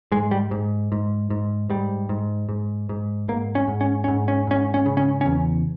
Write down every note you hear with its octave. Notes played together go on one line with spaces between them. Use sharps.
G#2 G#3
G3
G#2
G#2
G#2
G#2 G3
G#2
G#2
G#2
G#2 A#3
C#4
G#2
C#4
G#2 C#4
C#4
G#2 C#4
C#4
C#3
C#4
E2 C#4